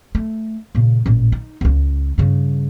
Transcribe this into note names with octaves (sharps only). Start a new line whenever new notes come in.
A3
A#2 C#3
A1 A#2
D#4
D1 C#2
G2 C#3